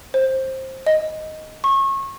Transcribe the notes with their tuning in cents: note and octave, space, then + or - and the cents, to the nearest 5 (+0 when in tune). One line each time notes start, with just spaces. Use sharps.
C5 +15
D#5 +5
C#6 -30